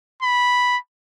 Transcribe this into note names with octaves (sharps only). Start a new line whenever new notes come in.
B5